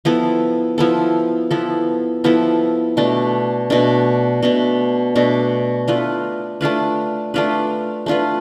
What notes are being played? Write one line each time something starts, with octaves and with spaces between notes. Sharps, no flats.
F3 B3 E4 A4
F3 B3 E4 A4
F3 B3 E4 A4
F3 B3 E4 A4
B2 A3 D4
B2 A3 D4
B2 A3 D4
B2 A3 D4
A3 D4 F4 B4
A3 D4 F4 B4
A3 D4 F4 B4
A3 D4 F4 B4